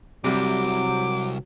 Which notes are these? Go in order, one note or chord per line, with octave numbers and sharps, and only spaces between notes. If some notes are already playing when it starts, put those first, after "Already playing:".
C2 C3 F#3 G3 D6